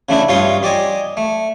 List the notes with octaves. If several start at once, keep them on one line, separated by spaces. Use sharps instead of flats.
C#3 A3 D4 E4
G2 F4 C#5 C6 D#6
G4 D5 D#5 G#5
A3